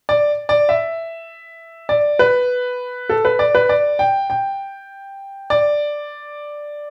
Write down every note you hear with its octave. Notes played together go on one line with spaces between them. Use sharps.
D5
D5
E5
D5
B4
A4
B4
D5
B4
D5
G5
G5
D5